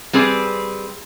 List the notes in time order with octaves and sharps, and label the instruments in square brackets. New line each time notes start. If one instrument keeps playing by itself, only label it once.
[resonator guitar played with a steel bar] G3 C4 G#4 B4 D5